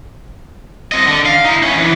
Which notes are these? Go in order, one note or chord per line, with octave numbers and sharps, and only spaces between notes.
C4 D#5
D3
F5
D#4 E4
B3 C#4
E3